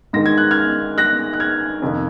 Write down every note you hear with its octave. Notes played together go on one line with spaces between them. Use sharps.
G#2 D#3 A#6
G#6
F#6
F6 G#6
F#6 A#6
F#6
F6 G#6
F2 C3 D#3